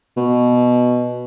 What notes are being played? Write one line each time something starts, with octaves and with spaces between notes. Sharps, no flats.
B2